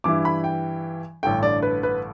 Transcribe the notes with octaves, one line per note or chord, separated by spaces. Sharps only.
G2 E3 G3 E4 D6
B5
G5
A1 G2 D3 A3 G5
D5
B4
B4